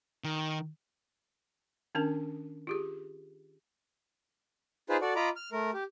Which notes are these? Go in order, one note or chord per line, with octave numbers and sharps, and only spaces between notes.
D#3
D#3 C#4 D4 A#4 A5
F4 G4 G#4
D#4 F4 G#4 B4 C5
F#4 A4 D5
F4 D#5 A#5 B5 D6
F6
A3 A#4
G4